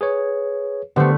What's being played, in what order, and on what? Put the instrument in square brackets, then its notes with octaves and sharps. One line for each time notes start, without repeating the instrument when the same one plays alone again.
[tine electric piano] G#4 B4 C#5
[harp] D3 A3 [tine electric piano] B3 G4 C5